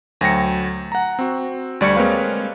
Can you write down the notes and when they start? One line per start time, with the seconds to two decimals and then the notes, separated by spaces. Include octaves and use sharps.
0.21 D2 F#3 G5 A#6 C#7
0.92 F#5 A#5
1.19 C4 F#4
1.81 D2 G3 D5 C#6 G#6 C#7
1.96 G#3 A#3 C4 B4 C#5 F5